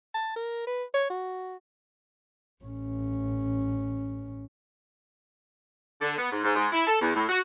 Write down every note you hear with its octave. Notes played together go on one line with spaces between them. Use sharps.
A5
A#4
B4
C#5
F#4
A1 C#4
D3
B3
G#2
G#2
G#2
E4
A4
E2
A2
F#4